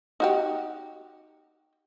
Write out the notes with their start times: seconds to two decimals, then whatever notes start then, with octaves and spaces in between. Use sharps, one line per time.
0.20 D#4 F#4 G4